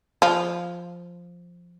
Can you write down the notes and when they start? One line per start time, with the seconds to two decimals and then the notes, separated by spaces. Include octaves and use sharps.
0.22 F3